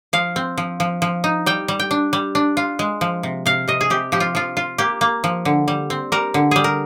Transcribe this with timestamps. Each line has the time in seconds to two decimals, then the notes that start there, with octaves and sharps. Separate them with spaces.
0.13 F3 F5
0.36 C4
0.58 F3
0.80 F3
1.02 F3
1.24 D#4
1.46 G3 G5
1.68 G3
1.80 G5
1.91 D4
2.13 G3
2.35 D4
2.57 F4
2.79 G#3
3.01 F3
3.23 C3
3.46 C3 F5
3.68 C3 D#5
3.81 G#4
3.90 C3 G4
4.12 F3 G4
4.20 F4
4.35 F3 F4
4.57 F4
4.78 A#3 G4
5.01 A#3
5.24 F3
5.45 D3
5.68 G3
5.90 C4
6.12 G3 A#4
6.34 D3
6.51 G3 G#4
6.64 A#4